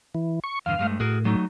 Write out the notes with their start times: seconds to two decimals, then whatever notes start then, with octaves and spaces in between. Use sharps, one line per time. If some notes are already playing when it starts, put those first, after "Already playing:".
0.15 E3
0.44 C#6
0.66 E2 G2 D3 F5
0.79 G2 G#3 A3
1.00 A2 F#4 G#4 A#4
1.25 F#3 A3 D#4